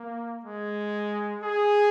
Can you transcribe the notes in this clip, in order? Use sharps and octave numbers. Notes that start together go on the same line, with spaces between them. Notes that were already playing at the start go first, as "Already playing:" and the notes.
Already playing: A#3
G#3
G#4